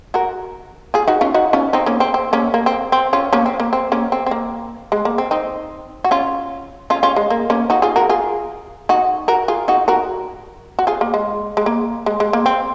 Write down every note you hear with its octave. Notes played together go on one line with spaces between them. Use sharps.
F#4 A#4
F4 G#4
D#4 F#4
C#4 F4
D#4 F#4
C#4 F4
C4 D#4
A#3 C#4
C4
C4
A#3 C#4
A#3
C4
C4
C#4 F4
A#3 C#4
C4
A#3
C4
A#3 C#4
C4
C4
A#3
G#3
A#3
C4
C4 D#4
F#4
C#4 F4
C#4 F4
C#4 F4
G#3
A#3
A#3 C#4
D#4 F#4
F4 G#4
F#4 A#4
F4 G#4
D#4 F#4
F#4 A#4
F4 G#4
D#4 F#4
F#4 A#4
F#4
F4 G#4
A#3
G#3
G#3
A#3
G#3
G#3
A#3
C4